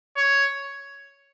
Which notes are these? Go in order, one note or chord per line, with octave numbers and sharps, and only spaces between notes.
C#5